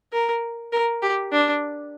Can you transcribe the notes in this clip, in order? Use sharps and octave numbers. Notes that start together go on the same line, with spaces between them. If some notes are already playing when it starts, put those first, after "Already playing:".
A#4
A#4
G4
D4